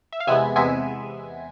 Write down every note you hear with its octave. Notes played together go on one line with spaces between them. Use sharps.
E5
F5
E2 C3 G#3 B3 E5 G#5
E2 C3 G#3 B3 E5 G#5